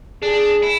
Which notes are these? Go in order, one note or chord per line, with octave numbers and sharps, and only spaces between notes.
D4 G#4
E4